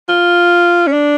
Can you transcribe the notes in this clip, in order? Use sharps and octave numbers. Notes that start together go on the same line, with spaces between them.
F4
C#4
D4